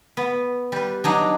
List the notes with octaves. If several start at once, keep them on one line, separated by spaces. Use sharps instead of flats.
B3
G3 B4
F#3 D4 D#4